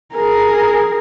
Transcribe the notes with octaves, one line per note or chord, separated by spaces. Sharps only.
G#4 A#4